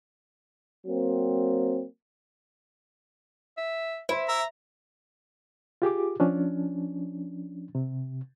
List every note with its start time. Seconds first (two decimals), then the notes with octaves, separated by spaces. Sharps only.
0.86 F#3 A#3 C4
3.57 E5
4.09 E4 C5 B5 C6
4.28 E5 A#5
5.82 F4 G4 G#4 D6
6.20 F3 C#4 D4
7.75 C3